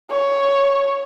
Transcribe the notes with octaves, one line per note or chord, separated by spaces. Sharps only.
C#5